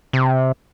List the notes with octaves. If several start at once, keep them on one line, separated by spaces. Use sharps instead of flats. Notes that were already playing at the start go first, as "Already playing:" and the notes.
C3